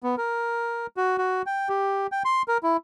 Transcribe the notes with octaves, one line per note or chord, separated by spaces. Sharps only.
B3
A#4
F#4
F#4
G5
G4
G5
C6
A#4
E4